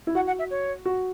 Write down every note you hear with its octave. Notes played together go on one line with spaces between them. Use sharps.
E4
F#4 F#5
F#5
E5
C#5
F#4